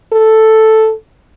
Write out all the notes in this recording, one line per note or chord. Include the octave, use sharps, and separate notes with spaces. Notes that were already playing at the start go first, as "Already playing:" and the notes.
A4